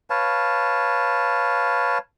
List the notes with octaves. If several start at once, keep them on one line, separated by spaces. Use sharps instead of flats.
B4 C#5 F5 A5